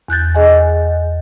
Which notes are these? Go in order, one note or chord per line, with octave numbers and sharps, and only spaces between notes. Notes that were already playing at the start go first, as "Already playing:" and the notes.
E2 F#6 G6 A6
G#4 D#5 F#5 G#5